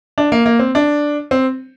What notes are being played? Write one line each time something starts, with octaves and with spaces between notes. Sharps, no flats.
D4
A#3
A#3
C4
D4
C4